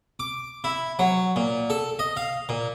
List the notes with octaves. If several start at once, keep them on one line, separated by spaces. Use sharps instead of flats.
D6
E4
F#3
A#2
A4
D#5
F5
A#2